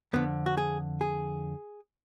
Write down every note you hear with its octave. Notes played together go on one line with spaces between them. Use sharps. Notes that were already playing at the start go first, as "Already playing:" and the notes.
F2 D3 B3
F#4
G#4
G#4